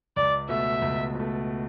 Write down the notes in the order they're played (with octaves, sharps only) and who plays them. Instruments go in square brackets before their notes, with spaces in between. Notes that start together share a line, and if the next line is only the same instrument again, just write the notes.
[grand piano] C#2 [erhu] D5
[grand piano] B2 A3 [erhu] E5
[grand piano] C#2
B2 A3